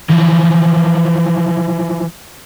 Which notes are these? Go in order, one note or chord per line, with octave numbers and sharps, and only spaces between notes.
E3 F3